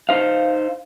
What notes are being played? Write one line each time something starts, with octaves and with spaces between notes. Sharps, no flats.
D#4 C5 F5